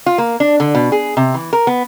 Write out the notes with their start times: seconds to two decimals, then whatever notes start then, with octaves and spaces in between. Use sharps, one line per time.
0.06 F4
0.18 A#3
0.40 D4
0.60 D3
0.75 B2
0.92 G#4
1.17 C3
1.34 E3
1.53 A#4
1.67 B3